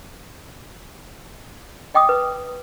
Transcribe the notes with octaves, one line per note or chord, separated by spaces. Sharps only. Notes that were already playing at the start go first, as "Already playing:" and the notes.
D#5 G5 D6 D#6
B4